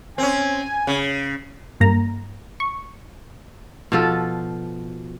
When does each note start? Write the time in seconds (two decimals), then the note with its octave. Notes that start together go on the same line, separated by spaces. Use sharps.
0.18 C4 C#4 G#5
0.87 C#3
1.80 G2 A#3 A#5
2.60 C#6
3.92 B2 F3 A4